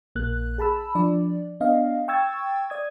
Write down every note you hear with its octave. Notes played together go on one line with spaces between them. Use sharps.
A#1 A#3 F#6
G#4 A5 B5 E6
F3 D4 D5
B3 D4 D#5 F5
G5 C#6 E6 G#6 A6
D5 D#6 G#6